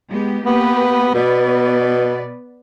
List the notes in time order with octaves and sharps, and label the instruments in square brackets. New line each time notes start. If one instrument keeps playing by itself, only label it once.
[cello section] G#3 B3 G4
[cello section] A#3 G4 B4 [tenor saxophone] B3
[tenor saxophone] B2 [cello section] B3 B4 D5